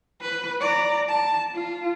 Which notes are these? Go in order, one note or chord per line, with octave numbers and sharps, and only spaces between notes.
B4
D5 A#5
A5
F4